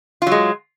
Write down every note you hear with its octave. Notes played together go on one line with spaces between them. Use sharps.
F#3 G#3 F4